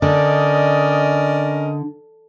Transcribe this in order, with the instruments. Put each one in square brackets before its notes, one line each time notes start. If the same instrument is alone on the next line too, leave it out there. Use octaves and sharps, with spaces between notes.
[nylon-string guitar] D3 [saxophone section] C#4 A#4 D#5 [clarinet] D5